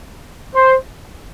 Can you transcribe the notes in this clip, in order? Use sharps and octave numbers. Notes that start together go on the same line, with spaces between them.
C5